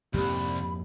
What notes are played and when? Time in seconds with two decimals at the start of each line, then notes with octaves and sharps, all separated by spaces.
0.14 C2 F2 G#2 A#3 G4 B5